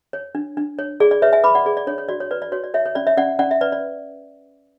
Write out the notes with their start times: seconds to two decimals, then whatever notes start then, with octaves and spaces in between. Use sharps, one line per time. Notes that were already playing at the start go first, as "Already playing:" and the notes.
0.13 C#5
0.35 D4
0.57 D4
0.79 C#5
1.00 G#4 D5
1.11 D5
1.22 B4 C#5 E5
1.33 E5 G#5
1.44 B4 B5 D6
1.55 D5 F#5
1.66 G#4 D5
1.77 D5
1.87 D4 C#5
1.98 C#5
2.08 F#4 D5
2.20 C#5
2.31 B4 D5
2.42 D5
2.52 F#4 C#5
2.64 D5
2.74 C#5 E5
2.86 C#5
2.95 C#4 D5
3.07 C#5 E5
3.17 C#4 D5 F#5
3.39 C#4 D5 F#5
3.51 E5
3.61 B4 D5
3.72 D5